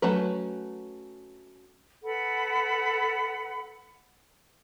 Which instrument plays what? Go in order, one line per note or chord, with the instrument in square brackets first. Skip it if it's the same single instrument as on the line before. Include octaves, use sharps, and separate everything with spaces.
[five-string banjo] F#3 A3 C#4 B4
[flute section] A4 B4 F#5 B5